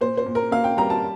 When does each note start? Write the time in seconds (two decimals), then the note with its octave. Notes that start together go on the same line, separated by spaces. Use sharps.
0.01 A#2 C5
0.17 C5
0.26 A#2
0.35 A#4
0.51 A#3 F5
0.64 G5
0.77 G3 A#5
0.90 A5